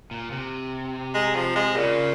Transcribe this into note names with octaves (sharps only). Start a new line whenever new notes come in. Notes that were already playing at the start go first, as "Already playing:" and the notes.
A#2
C3
G#3
F3
G#3
A#2 C#3